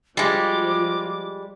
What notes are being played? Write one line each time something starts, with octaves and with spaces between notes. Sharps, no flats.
F3 G3 G#3 F4 F#4 D6